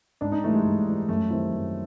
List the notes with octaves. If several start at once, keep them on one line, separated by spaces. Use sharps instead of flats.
G#2 D4
D#4
E3 G3 A3
G#3
G#2
E3 G3
F#2 A3
D#3 G3 C4 E4
F#2